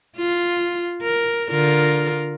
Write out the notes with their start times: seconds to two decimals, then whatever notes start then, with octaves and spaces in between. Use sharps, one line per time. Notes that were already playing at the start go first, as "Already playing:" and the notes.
0.17 F4
1.03 A#4
1.50 D3 F4 A#4